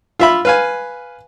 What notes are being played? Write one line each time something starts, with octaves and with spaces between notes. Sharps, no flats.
F4 E5 B5
B4 F5 G#5